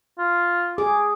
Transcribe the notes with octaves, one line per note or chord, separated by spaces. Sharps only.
F4
G#4 D6